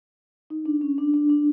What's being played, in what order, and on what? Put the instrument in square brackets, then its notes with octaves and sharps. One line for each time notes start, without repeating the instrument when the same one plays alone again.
[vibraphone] D#4
D4
C#4
D4
D4
D4